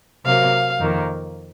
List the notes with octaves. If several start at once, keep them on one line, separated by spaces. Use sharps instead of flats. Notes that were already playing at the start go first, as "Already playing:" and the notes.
C3 F#3 A#3 F5
F2 D#3 A#3